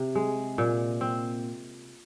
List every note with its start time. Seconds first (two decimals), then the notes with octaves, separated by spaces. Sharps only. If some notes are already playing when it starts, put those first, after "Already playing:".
Already playing: C3
0.15 G#3
0.58 A#2
1.01 C4